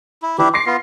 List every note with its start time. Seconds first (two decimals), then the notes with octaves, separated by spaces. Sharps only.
0.22 E4
0.38 E3 D4 E4 G4
0.54 C6 D6 A#6 C7
0.66 B3 F4